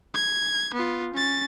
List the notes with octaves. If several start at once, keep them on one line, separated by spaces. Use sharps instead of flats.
G#6
B3 F4
C#4 A6